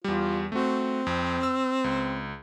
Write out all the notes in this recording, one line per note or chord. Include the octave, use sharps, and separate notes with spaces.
E2 G3 F4
A3 C4 F#4
F2
E6
C#2